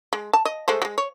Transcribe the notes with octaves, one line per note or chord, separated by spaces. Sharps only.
G#3
A5
D#5
G#3 A3 C5
F#3 G#3
C#5